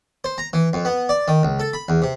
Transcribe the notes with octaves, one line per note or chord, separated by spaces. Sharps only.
C5
A#5
E3
F2
B3
D5
D#3
C#2
A4
B5
E2
C3